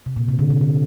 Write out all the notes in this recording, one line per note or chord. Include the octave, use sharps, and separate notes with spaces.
C3
A#2
C3
D3
C3
D3